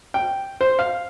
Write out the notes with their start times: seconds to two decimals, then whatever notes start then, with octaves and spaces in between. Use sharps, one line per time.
0.14 G5
0.61 C5
0.79 F5